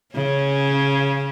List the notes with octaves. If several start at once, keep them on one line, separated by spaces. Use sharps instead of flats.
C#3 C#4